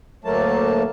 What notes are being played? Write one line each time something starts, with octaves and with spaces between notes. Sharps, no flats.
D2 F#3 A3 A#3 A5